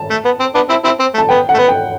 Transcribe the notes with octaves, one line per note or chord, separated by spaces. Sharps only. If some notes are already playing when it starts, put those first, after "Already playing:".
Already playing: A5
A3
B3
C4
B3 D4
C4 E4
C4 E4
C4
A3
A5
B3 G5
F#5
A3
B3
G5